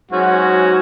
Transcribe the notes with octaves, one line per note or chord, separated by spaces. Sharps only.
G#2 F#3 C#4 F#4